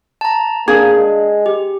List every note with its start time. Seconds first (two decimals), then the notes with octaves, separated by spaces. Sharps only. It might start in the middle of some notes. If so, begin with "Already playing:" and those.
0.21 A5 A#5
0.68 A#3 D4 G#4
0.97 G#3
1.46 G4